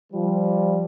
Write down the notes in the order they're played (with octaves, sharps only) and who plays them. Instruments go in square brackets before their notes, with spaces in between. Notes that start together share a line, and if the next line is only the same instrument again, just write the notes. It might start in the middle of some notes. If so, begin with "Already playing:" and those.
[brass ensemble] F3 G3